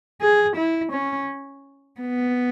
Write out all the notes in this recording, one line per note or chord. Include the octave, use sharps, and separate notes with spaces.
G#4
E4
C#4
B3